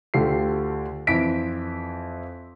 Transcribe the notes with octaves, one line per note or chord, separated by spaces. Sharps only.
D2 F4 G4 A4 C7
F2 E3 E4 B6 D7